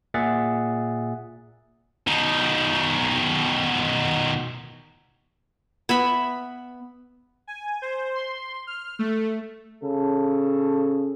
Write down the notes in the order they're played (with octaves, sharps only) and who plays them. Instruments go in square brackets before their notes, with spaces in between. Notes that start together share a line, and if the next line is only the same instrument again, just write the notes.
[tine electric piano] A#2 G#4 E5 F#5 A6
[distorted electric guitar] B2 D#3
[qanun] B3 E5 B5
[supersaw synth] G#5
C5
C6
F6
A3
[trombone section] C#3 A4